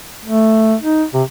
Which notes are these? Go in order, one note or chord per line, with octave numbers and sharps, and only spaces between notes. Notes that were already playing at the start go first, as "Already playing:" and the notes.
A3
D#4
C3